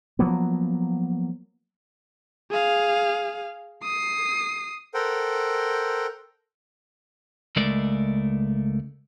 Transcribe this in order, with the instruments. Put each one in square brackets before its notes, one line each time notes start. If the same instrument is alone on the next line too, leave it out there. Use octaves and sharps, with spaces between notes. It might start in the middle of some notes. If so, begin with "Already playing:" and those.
[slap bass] F3 F#3 A#3 B3
[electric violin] G#4 F5
D#6 C7
[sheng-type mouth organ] A4 A#4 C5 F#5 G5
[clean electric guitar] C#2 G#3 A3 A#4 D5